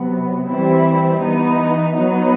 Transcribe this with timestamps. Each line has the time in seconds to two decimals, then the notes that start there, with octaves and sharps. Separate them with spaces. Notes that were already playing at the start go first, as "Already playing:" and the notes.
Already playing: C3 F#3 B3
0.49 E3 G3 C4 E4
1.22 E3 B3 D#4
1.95 F#3 B3 D#4